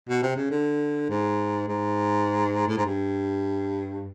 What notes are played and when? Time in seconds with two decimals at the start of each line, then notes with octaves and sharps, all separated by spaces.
0.09 B2
0.23 C3
0.36 C#3
0.51 D3
1.09 G#2
1.68 G#2
2.68 A2
2.77 G#2
2.86 G2